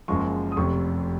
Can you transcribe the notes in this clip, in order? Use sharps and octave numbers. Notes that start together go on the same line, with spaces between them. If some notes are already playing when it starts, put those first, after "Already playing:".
F#1 F#2 F3 G#3 C#6
D#6
F1 F2 C3 C#6